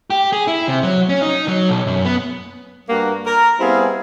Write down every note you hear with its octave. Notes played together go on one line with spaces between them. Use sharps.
G4
G#4
E4
C3
F#3
C#4
D#4
F#3
B1
F#2
B3
G2 A#3 F#4
A#4
G3 B3 C4 E4 G#4 F5